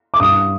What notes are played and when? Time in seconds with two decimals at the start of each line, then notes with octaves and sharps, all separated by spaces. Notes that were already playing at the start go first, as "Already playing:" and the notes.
0.14 D6
0.20 G2 D#6